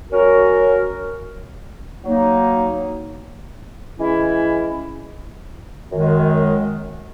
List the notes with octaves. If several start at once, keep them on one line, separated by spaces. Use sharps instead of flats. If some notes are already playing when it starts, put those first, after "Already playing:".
F#3 C#4 F#4 A#4
F#3 A#3 D#4
E3 G#3 C#4 E4
F#2 D#3 G#3